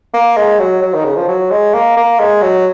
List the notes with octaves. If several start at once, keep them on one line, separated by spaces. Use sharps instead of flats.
A#3
G#3
F#3
F#3
D#3
C#3
F3
F#3
G#3
A#3
A#3
G#3
F#3